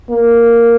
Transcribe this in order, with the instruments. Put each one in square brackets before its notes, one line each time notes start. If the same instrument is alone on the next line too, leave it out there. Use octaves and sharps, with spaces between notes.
[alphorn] A#3